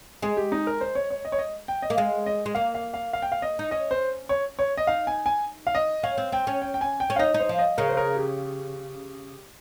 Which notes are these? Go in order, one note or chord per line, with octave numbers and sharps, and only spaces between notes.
G#3 G#4
G4
D#4
A#4
C5
C#5
C#5
D#5
C#5
D#5
G5
D#5
A#3
G#3 F5
D#5
G#3
A#3 F5
F5
F5
F5
G5
F5
D#5
D#4
C#4 D#5
C5
C#5
C#5
D#5
D#4 F5
G#5
G#5
F5
D#5
C#4 F5
C4
C4 G5
C#4
G5
G5
G#5
G5
C#4
F5
D#4 D#5
D#4
C5
F3
D#5
C#3 A#4
C5
A#4
G4